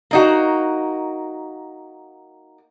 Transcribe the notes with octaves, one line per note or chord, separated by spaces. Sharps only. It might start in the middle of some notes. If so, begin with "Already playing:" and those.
A#3 D#4 F#4